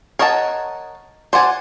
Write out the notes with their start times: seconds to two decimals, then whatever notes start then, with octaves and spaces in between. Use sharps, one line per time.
0.19 A#4 C#5 D#5 F#5 A5
1.33 C5 D5 F#5 G#5